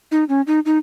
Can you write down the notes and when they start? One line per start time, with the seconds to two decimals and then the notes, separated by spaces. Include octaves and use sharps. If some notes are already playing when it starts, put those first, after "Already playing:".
0.11 D#4
0.29 C#4
0.47 D#4
0.65 D#4